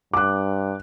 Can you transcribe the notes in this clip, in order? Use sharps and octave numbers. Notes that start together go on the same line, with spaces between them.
G2 D6 F#6